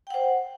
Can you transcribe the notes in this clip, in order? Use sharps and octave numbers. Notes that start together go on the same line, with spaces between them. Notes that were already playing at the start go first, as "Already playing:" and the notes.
C5 F#5 G5